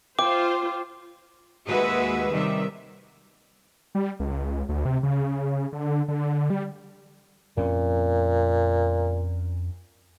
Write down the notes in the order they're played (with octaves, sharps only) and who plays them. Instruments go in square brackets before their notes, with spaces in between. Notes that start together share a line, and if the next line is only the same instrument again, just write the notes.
[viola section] F4 C5 [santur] G5 [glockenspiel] D6
[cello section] D#2 G#3 F#4 G#4 B4 E5
C3 D#3 G3 E5
[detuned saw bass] G3
C#2
D2
C3
C#3
D3
D3
G3
[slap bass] F2 C4 C#4 [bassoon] A#2